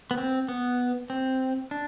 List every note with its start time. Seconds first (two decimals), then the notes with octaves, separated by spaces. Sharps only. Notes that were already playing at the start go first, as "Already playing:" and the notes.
0.11 B3
0.17 C4
0.49 B3
1.10 C4
1.71 D4